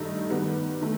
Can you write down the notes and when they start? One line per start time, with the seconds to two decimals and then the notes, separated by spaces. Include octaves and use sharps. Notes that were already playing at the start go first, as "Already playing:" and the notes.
Already playing: G2 D#3 A3 D#4
0.30 D#3 G3 B3
0.81 D#3 A3